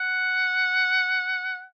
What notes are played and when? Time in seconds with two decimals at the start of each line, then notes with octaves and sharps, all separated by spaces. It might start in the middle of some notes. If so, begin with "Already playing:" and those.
Already playing: F#5